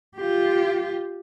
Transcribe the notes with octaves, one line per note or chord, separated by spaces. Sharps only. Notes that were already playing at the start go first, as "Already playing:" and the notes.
F4 G4